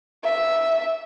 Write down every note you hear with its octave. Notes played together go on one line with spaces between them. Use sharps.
E5